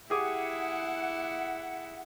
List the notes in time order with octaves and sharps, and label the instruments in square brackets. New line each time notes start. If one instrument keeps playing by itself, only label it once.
[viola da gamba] E4 [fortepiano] G4 G#4 D6 [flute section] F#5